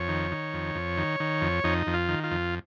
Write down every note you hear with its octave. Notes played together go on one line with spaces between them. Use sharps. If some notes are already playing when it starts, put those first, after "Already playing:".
Already playing: F2 C#5
D#3
D#3
F2
F2
D#3
D#3
F2
F2 D#4
F2
F4
D#3
F4
F2